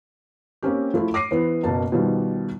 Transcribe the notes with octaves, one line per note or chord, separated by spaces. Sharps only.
A#3 C4 C#4 G4
F3 A3 E4
D6 A#6 C7 D#7
E3 B3 C5
F#1 B2 A#3 A5
B2 D#3 F3 G3